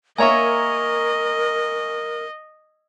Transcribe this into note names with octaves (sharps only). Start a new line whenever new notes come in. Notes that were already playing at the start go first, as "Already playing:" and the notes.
A#3 A#4 C#5 D#5 E5 G#5 A#5 C#6